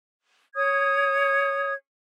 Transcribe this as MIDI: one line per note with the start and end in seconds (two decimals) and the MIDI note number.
0.55 1.74 73
0.55 1.74 87
0.55 1.74 92